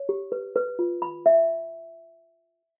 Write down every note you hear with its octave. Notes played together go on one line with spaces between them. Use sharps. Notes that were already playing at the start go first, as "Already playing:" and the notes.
Already playing: C#5
G4
B4
B4
F4
B5
E5